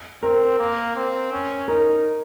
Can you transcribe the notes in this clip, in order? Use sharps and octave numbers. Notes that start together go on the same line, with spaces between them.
C4 A#4
A#3
C4
C#4
D#4 A#4